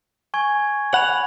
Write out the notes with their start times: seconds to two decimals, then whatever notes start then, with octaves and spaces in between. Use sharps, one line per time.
0.34 G#5 C#6 G#6
0.94 F#5 B5 F7